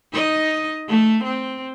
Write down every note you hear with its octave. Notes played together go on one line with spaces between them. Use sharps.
D#4 D#5
A3
C4